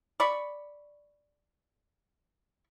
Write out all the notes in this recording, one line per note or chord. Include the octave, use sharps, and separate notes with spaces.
D5 B5 C#6